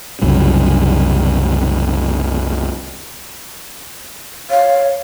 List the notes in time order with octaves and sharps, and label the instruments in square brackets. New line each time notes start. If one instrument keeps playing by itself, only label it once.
[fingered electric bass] C2 F#2 C#3
[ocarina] C#5 [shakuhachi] F5